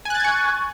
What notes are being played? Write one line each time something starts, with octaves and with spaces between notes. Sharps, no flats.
G#5 C#6 F#6 G#6 A6